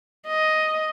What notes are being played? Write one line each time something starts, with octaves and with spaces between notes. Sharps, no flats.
D#5